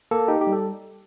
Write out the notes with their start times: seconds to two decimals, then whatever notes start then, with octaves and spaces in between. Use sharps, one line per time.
0.11 A#3 A4
0.28 D#4 G4
0.41 G4
0.47 G3
0.53 A4